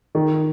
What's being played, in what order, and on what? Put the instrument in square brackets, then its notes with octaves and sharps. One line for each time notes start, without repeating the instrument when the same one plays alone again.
[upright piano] D#3